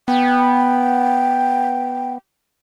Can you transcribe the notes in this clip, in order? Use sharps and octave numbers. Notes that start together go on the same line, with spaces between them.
B3 G5